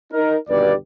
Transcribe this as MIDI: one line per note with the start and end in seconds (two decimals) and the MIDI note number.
0.13 0.36 63
0.13 0.36 70
0.49 0.73 31
0.49 0.73 39
0.49 0.73 47
0.49 0.73 67
0.49 0.73 71
0.49 0.73 74